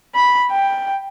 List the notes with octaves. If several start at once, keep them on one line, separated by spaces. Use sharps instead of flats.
B5
G5